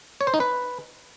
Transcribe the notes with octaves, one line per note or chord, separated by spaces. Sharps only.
C#5
C5
D#4
B4